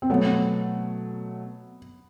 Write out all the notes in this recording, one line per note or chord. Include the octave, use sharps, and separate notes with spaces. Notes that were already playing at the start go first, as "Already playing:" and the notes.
C4
B2 F#3 A3 B3